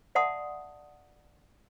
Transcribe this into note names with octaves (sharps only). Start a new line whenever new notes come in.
D5 E5 F#5 A5 C6 D#6